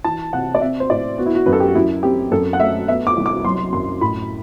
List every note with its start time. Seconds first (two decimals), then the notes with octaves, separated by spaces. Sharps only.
0.04 E3 A5
0.33 C3 F#5
0.55 D5
0.61 C4 E5
0.80 C5
0.90 A2 D5
1.18 B3 F#4
1.26 E4
1.35 F#4
1.46 F#2 B4
1.53 A4
1.60 G4
1.68 F#4
1.75 F#2 E4
2.03 C4 G4
2.31 F#2 A4
2.53 F#5
2.60 A3 E5
2.88 B3 E5
3.07 D6
3.17 C2
3.26 D6
3.44 F#3 C6
3.73 F#2 C6
4.01 A2 B5